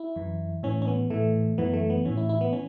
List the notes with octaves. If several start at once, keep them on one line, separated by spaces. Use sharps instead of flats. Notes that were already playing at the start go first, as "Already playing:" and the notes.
Already playing: E4
F#2 E3
A2 E3 C#4
C#4
B3
A2 E3 A3
F#2 E3 B3
A3
B3
A2 E3 C#4
E4
E4
B3
E3 C#4